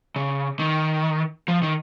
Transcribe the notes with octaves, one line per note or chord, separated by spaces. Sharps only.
C#3
D#3
F3
D#3